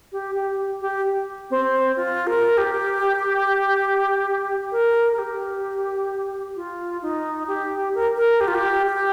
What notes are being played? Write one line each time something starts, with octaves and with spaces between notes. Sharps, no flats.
G4
G4
G4
C4
F4
A#4
G4
A#4
A#4
G4
F4
D#4
G4
A#4
A#4
G4
F4
G4
G4